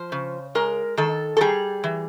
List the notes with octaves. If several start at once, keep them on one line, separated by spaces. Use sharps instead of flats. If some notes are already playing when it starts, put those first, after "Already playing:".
Already playing: F3 C5
C#3
G#3 A#4
D#3 A4
A4
G3 G#4
E3